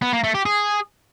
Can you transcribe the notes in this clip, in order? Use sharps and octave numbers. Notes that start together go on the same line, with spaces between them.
B3
A#3
A3
G4
G#4